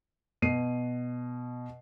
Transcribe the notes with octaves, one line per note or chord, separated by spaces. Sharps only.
B2 C7 D#7